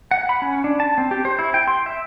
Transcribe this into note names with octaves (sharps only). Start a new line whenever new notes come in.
F#5
B5
C#4
D4
A5
C4
G4
C5
E4
G5
C6
E5